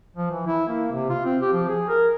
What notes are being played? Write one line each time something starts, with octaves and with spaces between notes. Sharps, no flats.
F3
E3
E4
A#3
C3
F4
C4
G4
F3
G#4
A#4